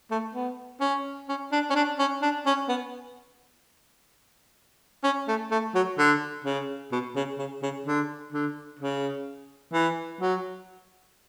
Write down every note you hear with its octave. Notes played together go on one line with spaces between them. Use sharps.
A3
B3
C#4
C#4
D4
C#4
D4
C#4
D4
C#4
B3
C#4
A3
A3
F#3
D3
C#3
B2
C#3
C#3
C#3
D3
D3
C#3
E3
F#3